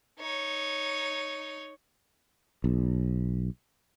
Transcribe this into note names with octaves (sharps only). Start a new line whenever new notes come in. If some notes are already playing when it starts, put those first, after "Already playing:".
D#4 C#5
B1